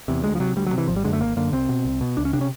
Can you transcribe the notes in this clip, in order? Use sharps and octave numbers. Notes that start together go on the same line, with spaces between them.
E2 C3
D2 G#3
F3
C3 F#3
D2 G3
F#3
C3
E3
G#1 F3
G3
F#2 D3 G#3
A3
G#1 A#3
F#2 D3 A#3
C2 C4
B2
C2
B2
C#2 D4
C#4
C3 D4
C#4